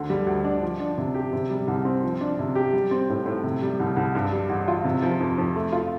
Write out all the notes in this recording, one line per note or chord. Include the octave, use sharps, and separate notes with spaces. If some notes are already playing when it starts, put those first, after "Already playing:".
Already playing: D2 D3
G3
D2
D4
F3
D4
C3
G4
C3
G3
C2
C4
F3
D4
C3
G4
G3
C4
A2
A2
C3
G3
C2
C2
G2
G3
A1
F4
C3
F3
F2
F2
A3
F4